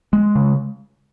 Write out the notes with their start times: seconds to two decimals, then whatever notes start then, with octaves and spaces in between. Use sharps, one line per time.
0.13 G#3
0.35 C#3